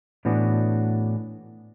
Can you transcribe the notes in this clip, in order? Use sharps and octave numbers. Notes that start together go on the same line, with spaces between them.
A2 E3 B3 D4 F#4